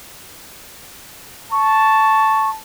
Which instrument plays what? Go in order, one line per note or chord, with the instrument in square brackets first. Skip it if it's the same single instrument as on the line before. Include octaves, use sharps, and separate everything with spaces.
[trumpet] A5 [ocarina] C#6